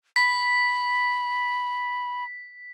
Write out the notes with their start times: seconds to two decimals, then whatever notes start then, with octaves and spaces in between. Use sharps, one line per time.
0.16 B5 B6